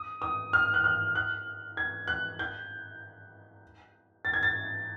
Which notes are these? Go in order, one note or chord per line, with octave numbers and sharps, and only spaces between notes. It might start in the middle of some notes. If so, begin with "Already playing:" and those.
Already playing: D#6
D#6
F6
F#6
F6
F#6
G#6
F#6
G6
A6
G#6
A6